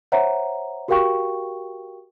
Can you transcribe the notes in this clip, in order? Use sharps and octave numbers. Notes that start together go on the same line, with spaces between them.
C5 C#5 E5 F#5 A#5
F#4 G4 A#4 F5 G5 C#6